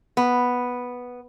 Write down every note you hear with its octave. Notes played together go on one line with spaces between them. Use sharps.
B3